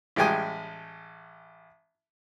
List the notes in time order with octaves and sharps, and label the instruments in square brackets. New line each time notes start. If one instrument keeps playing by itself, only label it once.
[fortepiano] A1 G3 G#3 G5 G#5 D#6